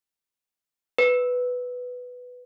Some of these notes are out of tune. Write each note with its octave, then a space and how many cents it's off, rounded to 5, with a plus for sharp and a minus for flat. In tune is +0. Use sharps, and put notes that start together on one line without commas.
B4 +5